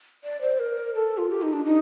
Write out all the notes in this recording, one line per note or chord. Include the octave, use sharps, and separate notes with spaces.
D5
C5
A#4
A4
F4
G4
D#4
D4
D#4